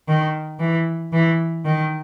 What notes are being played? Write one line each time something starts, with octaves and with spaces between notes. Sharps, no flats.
D#3
E3
E3
D#3